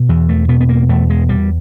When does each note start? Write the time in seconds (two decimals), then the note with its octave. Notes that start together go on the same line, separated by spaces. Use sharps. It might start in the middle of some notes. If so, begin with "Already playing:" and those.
Already playing: B2
0.09 E2 E3
0.29 A3
0.49 B2 B3
0.61 B3
0.69 A#3
0.89 E2 A3
1.10 G#3
1.29 E2 G3